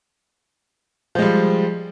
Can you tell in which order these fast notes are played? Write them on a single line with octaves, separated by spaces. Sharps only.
F3 G#3 G3